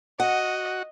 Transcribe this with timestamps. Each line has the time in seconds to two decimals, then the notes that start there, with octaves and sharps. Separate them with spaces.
0.20 F#4 D#5 F#5